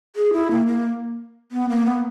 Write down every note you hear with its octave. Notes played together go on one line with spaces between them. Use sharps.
G#4
E4
A#3
A#3
B3
A#3
B3